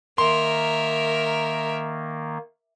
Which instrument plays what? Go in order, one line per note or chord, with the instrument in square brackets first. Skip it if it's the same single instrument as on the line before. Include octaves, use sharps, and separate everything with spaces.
[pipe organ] D#3 A#3 [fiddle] A#4 E5 [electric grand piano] C6